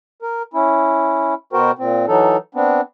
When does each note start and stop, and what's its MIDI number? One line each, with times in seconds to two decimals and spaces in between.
0.22 0.42 70
0.54 1.34 61
0.54 1.34 64
1.53 1.71 47
1.53 1.71 59
1.53 1.71 66
1.53 1.71 70
1.53 1.71 72
1.53 1.71 79
1.79 2.06 46
1.79 2.06 60
2.08 2.37 52
2.08 2.37 54
2.08 2.37 63
2.08 2.37 69
2.55 2.81 59
2.55 2.81 60
2.55 2.81 62